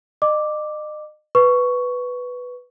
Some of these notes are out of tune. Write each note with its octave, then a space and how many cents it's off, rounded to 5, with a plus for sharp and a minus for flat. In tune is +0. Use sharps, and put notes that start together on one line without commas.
D#5 -35 D6 +0
B4 +0 C#6 +10